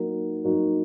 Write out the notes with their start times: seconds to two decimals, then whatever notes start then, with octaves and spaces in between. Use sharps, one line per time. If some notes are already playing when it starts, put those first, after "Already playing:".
Already playing: F#3 A#3 D#4 F#4 A#4
0.44 F#3 A#3 D#4 F#4 A#4